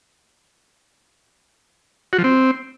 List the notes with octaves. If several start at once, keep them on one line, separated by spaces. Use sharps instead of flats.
F#4
F3
C4